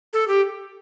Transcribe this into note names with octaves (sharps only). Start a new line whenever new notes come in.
A4
G4